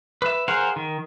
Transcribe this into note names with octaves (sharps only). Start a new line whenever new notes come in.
B4 E5
G#4 A#4 C5 F5 F#5
D#3